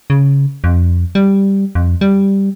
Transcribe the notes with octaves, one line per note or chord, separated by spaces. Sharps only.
C#3
F2
G3
F2
G3